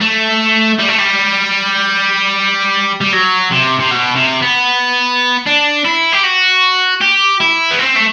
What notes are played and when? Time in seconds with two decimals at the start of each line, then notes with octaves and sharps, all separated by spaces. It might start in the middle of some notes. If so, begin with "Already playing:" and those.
0.01 A3
0.79 G3
0.88 A3
0.99 G3
3.01 G3
3.13 F#3
3.51 C3
3.79 C3
3.91 B2
4.15 C3
4.42 B3
5.46 D4
5.85 E4
6.12 G4
6.23 F#4
7.01 G4
7.40 E4
7.71 B3
7.79 C4
7.96 A3